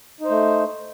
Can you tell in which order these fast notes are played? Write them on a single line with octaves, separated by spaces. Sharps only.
D#4 C5 A3